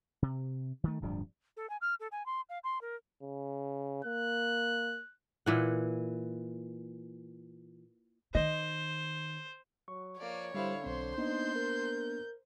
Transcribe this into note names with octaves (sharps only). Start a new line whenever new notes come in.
C3
D#3 A3
D1 G2 F3 D4
A4
G#5
F6
A4
G#5
C6
F5
C6
A#4
C#3
A#3 F#6
A#2 E3 F#5
D#3 C5 D#5
F#3 C#6
F3 A#3 C#5 D5
D3 G3 E4 G4 C5 F5
B1 C4 C5 C6
A#3 B3 D4 D#4 G6
A#4